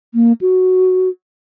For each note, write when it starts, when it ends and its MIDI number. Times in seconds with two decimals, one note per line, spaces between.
0.14 0.33 58
0.41 1.09 66